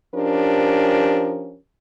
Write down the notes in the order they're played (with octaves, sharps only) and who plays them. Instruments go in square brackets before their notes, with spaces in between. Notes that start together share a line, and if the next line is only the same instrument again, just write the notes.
[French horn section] F3 C#4 D4 G4 A#4